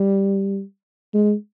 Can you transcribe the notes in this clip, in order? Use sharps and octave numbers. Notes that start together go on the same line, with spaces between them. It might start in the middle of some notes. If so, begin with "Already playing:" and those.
Already playing: G3
G#3